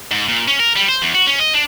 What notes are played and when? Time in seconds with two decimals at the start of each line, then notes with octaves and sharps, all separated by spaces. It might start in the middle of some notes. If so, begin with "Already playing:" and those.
0.11 G#2
0.28 A#2
0.48 C#4
0.60 A#4
0.76 G3
0.89 C5
1.02 E2
1.15 F#4
1.27 C#4
1.40 D#5
1.54 D4